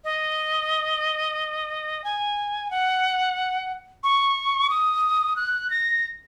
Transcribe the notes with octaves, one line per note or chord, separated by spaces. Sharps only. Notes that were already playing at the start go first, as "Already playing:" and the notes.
D#5
G#5
F#5
C#6
D#6
F#6
A#6